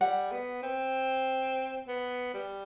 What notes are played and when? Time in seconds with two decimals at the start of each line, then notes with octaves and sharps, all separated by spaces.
0.01 G3 F#5
0.32 B3
0.63 C4
1.88 B3
2.34 G3